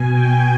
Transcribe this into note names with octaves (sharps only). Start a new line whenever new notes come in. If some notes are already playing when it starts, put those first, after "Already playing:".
Already playing: B2 G#5
G5